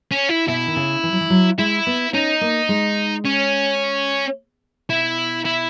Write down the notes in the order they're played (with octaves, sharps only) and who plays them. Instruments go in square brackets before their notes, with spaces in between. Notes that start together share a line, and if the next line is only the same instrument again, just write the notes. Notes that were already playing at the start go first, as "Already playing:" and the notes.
[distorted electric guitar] C#4
E4
[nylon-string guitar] B2 [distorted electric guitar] E4
[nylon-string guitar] D#3
C#3
E3
F#3
E3
F#3
[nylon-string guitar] G#3 [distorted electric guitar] E4
[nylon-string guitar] B3
[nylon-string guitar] C#4 [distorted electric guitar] D#4
[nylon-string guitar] A#3
G#3
[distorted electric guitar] C#4
[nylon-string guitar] B2 [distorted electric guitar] E4
[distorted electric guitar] E4